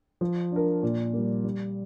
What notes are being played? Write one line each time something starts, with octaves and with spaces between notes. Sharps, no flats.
F3
D4 A#4
A#2
G3 A#3
G3